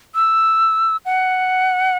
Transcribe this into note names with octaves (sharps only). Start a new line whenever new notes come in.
E6
F#5